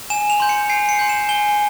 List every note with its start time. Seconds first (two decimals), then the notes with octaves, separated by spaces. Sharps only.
0.10 G#5 E7
0.30 F7
0.40 C6 G6
0.49 C#7
0.69 G#5 C7
0.89 C#7
0.99 C6 G6
1.09 E7
1.29 G#5 G7